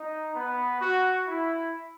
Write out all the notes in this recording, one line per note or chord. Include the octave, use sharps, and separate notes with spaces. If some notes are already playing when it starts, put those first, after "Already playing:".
Already playing: D#4
B3
F#4
E4